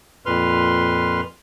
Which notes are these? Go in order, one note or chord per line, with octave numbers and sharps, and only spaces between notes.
F2 A#2 B4 C6 F6